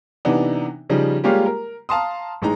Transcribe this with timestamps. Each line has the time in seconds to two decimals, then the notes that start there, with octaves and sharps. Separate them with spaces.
0.25 C3 E3 B3 D4 D#4
0.89 C#3 F3 G3 D#4
1.24 G3 G#3 A#3 F4 G4 C#5
1.46 A#4
1.89 F5 A5 A#5 C6 D#6
2.42 A1 G#3 D#4 A#5